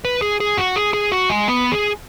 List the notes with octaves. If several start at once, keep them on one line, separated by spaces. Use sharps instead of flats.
B4
G#4
G#4
F#4
G#4
G#4
F#4
G#3
B3
G#4